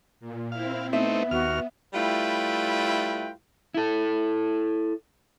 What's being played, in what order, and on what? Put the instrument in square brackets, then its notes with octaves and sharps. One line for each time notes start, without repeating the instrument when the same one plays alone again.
[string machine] A#2
[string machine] C4 E4 [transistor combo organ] F5
[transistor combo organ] A3 C4 D#4 [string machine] B3 [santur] E5
[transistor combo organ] D#2 F6 [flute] F#4
[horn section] G3 A3 E4 F4 B4 G5
[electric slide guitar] E4 A4